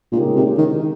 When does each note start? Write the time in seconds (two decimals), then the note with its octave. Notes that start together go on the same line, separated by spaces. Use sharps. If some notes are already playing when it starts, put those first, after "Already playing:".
0.12 A#2 C#3 G#3 D#4 G4 A#4
0.36 C3
0.58 D#3